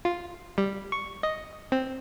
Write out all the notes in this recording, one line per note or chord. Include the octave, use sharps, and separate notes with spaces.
F4
G3
C#6
D#5
C4